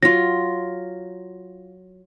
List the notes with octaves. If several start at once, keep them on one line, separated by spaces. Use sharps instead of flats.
F#3 F4 A#6